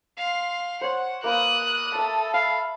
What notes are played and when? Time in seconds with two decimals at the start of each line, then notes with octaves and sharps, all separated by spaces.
0.17 F5 C6
0.81 C5 C#5 F#5
1.24 A#3 A#4 B4 D6 D#6 F#6
1.95 A4 E5 A5
2.34 F5 B5